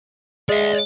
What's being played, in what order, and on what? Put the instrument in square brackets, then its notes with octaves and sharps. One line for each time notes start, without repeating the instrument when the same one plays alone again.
[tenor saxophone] G#3 [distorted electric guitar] D5 E5